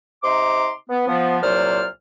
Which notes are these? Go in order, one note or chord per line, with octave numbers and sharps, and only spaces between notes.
C3 D#4 A#5 C6 D6
B3
F3 B3
C2 A#2 F#3 C5 D5 F6